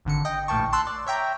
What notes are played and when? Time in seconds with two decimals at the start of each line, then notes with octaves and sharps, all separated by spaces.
0.05 G#1 D3 C#7
0.25 D#5 G5
0.48 A#1 A2 A#3 G5 A5 C#6
0.73 A5 C6 E6 F#6
0.87 D5
1.07 C#5 E5 G5 A#5